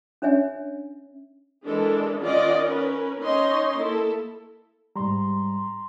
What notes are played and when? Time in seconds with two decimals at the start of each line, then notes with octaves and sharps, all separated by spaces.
0.22 C#4 D4 C#5 E5 G#5
1.65 E3 G#3 D4 A4 A#4
2.19 D#3 C#4 F4 D5 D#5 F#5
2.65 C#4 A#4 B4
3.21 C#4 D#4 C#5 D#5 C6
3.78 A#3 E4 A4
4.96 G#2 G3 A#5 C6